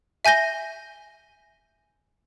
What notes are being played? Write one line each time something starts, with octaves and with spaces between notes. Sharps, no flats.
E5 G#5 G6 A#6 G7